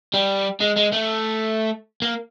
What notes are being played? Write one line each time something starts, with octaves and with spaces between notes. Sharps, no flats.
G3
G#3
G#3
A3
A#3